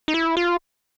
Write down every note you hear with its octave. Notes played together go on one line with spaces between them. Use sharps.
D#4
E4
F4